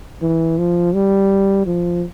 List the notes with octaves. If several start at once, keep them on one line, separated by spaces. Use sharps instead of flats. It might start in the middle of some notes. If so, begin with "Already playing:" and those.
E3
F3
G3
F3